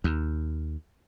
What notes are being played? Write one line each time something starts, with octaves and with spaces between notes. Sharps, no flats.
D#2